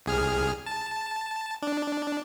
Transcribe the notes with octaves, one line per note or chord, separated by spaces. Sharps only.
C2 G#4 F6
A5
D4